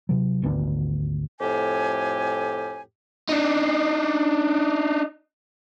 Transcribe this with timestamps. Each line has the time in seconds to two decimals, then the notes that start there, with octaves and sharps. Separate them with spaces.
0.09 C3 F#3
0.42 G#1 D2 B3 D4
1.40 F2 A2 G4 G#5
3.29 D4 D#4